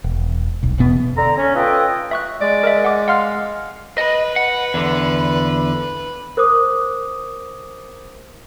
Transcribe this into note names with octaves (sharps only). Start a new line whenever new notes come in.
E1
D#1 B1
E1 E2 B2 B3
D3 A#5
C#4
F4 A4 B4 D#5 E5 G5
E5 C#6 F#6
G#3 D5
A#4 D#5 E5
F#5 D6
F5 F#5 C6 F6
B4 D#5
F#5
E2 D3
A#4 C5 D6 D#6